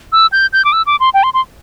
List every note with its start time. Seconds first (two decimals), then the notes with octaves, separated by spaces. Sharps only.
0.12 E6
0.32 G6
0.53 G6
0.65 D6
0.73 E6
0.87 D6
1.00 C6
1.14 G5
1.23 C6
1.34 C6